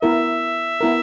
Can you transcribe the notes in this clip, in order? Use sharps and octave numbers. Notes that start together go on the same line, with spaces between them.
B3 E4 A#4 E5
B3 E4 A#4